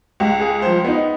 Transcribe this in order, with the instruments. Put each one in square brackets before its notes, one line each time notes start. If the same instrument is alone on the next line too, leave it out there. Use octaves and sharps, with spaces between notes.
[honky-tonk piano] C#2
[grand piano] G#4
F3 C5
B3 D#4